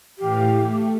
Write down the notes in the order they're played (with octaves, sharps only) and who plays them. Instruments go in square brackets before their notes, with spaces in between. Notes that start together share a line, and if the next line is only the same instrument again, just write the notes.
[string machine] A2 E3 F5 [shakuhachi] G4
[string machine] A3